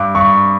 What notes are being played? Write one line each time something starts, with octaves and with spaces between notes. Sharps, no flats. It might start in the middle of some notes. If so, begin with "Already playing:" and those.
Already playing: G2 D6
G2 C#6